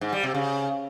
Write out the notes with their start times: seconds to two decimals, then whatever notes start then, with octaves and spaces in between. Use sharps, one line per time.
0.01 G#2
0.12 G3
0.23 C3
0.34 C#3